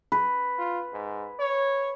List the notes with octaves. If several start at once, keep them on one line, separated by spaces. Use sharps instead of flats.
B4
F4
G#2
C#5